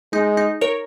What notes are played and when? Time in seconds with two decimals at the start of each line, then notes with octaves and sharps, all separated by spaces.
0.13 G#3 D#4
0.37 D#4
0.61 A#4 C#5